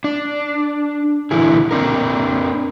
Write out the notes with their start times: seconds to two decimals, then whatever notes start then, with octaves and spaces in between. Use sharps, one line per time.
0.04 D4
1.31 A#2 D3 E3 E4 G#4
1.71 C4 D4 A#4